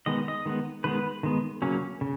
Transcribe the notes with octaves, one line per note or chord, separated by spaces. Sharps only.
D#3 G#3 B3 D#5
D#5
D#3 G#3 B3
D#3 G#3 B3 B4
D#3 G#3 B3
C#3 F#3 A#3 C#4
C#3